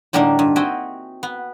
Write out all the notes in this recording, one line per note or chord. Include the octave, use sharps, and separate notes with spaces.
A2 D3 G3 A#3 D4 D#4
G2
C4 F#4 D#5 E5 G5 G#5
B3